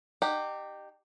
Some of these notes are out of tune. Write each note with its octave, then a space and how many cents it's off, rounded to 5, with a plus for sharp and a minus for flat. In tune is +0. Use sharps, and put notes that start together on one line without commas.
D#4 -35 G4 +0 F#5 +0